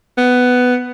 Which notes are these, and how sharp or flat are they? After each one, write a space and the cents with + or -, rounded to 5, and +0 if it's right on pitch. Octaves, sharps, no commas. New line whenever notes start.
B3 +10